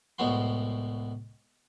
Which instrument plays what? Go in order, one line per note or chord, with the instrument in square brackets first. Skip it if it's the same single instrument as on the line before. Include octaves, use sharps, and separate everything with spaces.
[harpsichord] C2 A2 G#3 B3 F#4 C6